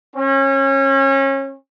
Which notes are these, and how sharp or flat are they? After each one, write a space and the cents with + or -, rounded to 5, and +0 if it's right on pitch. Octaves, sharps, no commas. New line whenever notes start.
C#4 -30